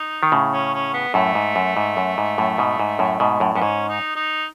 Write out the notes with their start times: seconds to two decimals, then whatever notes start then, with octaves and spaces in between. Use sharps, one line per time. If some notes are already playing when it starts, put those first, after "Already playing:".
Already playing: D#4
0.23 D#3
0.32 A2 C#3
0.53 C#4
0.74 C#4
0.93 B3
1.14 F#2 A2 A3
1.35 G#2
1.56 F#2
1.77 G#2
1.97 F#2
2.18 G#2
2.38 F#2 A2
2.58 G#2 B2
2.80 G#2
2.99 F#2 A2
3.20 G#2 B2
3.40 F#2 A2
3.55 F#2 B3
3.61 G#2 C#4
3.88 D#4
4.16 D#4